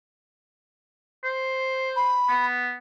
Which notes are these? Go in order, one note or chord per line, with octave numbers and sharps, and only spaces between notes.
C5
B5
B3